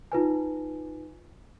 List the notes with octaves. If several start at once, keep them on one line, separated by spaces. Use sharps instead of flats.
D#4 F4 B4 G#5